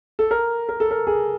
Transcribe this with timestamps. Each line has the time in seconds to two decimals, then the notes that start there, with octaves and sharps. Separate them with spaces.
0.19 A4
0.31 A#4
0.69 A#4
0.80 A4
0.91 A#4
1.07 G#4